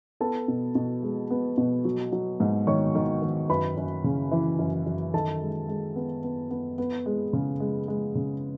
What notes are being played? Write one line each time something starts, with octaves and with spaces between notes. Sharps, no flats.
B3 A4 A5
B2
B2
G#3
B3
B2
F#3
F#3
G#2
D#3 C#5 C#6
D#3
D#3
F#2 B4 B5
F#2
C#3
E3
F#2
F#2
D#3 A4 A5
G#3
G#3
B3
B3
B3
B3
G#3
C#3
G#3
G#3
C#3